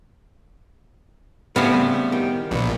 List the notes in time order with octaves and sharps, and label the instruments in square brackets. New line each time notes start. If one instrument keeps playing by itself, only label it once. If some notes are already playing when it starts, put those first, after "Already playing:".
[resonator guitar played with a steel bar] A2 C#3 G3 [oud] B3 [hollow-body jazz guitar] C4
[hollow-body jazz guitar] D#3 G4
[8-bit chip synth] A#1 [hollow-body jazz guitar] B3 D4